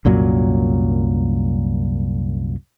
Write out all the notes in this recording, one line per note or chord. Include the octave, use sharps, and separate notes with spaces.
C2 F#2 A#2 F#3